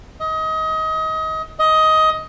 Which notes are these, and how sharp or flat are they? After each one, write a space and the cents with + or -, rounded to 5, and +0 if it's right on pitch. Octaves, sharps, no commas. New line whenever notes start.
D#5 +25
D#5 +15